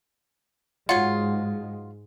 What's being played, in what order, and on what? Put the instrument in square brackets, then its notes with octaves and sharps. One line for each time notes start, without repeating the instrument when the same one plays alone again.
[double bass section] G#2 G#3 [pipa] F#3 F4 [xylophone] F#5